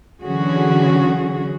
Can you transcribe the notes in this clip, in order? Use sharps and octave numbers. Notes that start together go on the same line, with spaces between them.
D3 E3 F#3 C#4 F#4 G#4